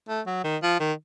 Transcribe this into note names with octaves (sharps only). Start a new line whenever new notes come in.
A3
F#3
D#3
F3
D#3